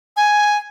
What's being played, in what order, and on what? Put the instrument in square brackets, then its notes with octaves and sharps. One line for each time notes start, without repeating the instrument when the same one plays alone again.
[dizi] G#5